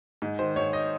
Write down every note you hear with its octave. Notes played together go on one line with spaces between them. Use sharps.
G#2
D#3 C5
G#2 C#5
D#5